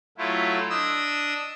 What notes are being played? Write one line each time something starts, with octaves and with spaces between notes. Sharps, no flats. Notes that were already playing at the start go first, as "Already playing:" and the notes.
F#3 A3 E4 F4
D4 D#5 D#6 E6